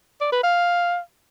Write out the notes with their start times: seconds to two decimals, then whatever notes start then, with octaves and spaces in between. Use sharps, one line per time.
0.21 D5
0.32 B4
0.43 F5